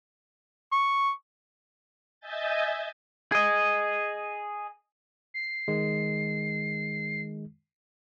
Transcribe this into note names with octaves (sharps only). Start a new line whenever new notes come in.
C#6
D#5 E5 G#5 G6 A6
G#4 D#5
C7
D#3 G#3